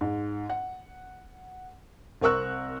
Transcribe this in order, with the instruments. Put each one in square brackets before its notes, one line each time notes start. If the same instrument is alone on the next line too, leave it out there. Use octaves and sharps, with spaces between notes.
[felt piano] G#2
F#5
C2 C4 A#4 C#6 E6 F#6